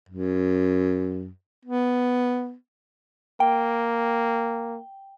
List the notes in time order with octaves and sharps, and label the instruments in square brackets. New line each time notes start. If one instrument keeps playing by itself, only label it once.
[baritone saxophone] F#2
B3
[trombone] A#3 [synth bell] G5